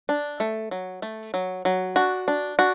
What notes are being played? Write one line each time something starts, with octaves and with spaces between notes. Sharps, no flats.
D4
A3
F#3
A3
F#3
F#3
D4 F#4
D4
D4 F#4